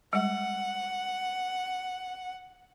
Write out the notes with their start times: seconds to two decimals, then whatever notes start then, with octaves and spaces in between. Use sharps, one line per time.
0.13 G3 G#3 F#5